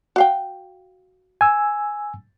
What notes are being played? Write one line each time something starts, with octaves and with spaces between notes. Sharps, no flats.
F#4 F5 G5
G#5 E6